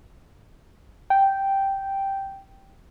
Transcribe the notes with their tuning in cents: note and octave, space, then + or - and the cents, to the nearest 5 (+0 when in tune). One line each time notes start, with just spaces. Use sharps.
G5 -5